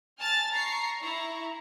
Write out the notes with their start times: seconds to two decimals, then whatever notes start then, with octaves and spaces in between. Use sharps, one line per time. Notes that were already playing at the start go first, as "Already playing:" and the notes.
0.19 G#5 A5 F6 A6
0.51 A#5 C#6 C7
1.00 E4 A#5 C#6